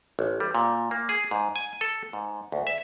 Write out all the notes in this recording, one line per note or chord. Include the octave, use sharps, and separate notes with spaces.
A1
G3
A#2
A#3
G#4
G#2
G#5
A4
G#2
D2
E5